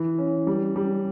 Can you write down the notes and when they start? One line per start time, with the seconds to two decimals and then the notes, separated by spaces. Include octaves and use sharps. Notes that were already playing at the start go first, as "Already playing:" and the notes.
Already playing: E3
0.18 C#4
0.47 G3
0.76 G3